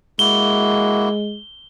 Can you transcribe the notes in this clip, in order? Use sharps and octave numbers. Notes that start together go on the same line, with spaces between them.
G#3 A#3 E4 F#4 G7